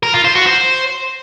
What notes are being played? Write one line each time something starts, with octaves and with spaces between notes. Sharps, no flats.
A#4
F4
C5
F#4
C5